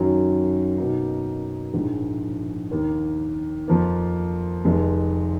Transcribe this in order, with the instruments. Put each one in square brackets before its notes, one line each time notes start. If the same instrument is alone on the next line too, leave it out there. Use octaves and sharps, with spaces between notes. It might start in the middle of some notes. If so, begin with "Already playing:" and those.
Already playing: [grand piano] F#2 D#3 F#3
B2 A#3 D#4
A#1 G#2 F3 G#3
D#2 D#3 A#3
F2 F3 A#3
F1 F2 D#3 G#3